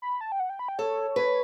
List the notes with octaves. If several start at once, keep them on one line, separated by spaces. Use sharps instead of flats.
B5
A5
G5
F#5
G5
B5
G5
A4 C#5
B4